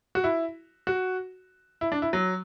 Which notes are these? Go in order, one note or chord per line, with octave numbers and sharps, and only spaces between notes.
F#4
E4
F#4
E4
D4
E4
F#3